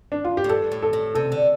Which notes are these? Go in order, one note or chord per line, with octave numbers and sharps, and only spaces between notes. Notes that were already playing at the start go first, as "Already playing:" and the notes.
D4
F4
G4
A2
G2 A4
A2
A4
A2
C3 A4
D3